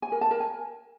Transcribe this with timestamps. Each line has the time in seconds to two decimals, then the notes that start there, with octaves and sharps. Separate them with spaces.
0.02 G#5
0.12 A#4
0.21 A5
0.31 A#4
0.40 G#5